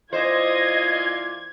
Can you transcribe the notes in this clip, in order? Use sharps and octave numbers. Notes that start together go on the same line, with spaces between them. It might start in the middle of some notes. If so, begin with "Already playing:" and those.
E3 F4 C5 D5 D#5 G#6